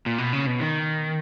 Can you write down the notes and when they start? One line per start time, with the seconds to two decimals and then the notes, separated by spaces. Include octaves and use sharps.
0.06 A#2
0.18 B2
0.33 C#3
0.47 B2
0.61 D#3